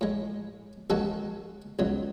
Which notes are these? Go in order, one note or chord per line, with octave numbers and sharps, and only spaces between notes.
A2 G#3
D#2 D#3 G#3 F#4 A4
C#2 B2 F#3